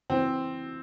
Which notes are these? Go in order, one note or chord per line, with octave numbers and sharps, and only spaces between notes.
E3 C4